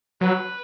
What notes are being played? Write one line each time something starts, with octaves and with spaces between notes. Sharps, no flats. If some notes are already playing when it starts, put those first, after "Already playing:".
F#3 B4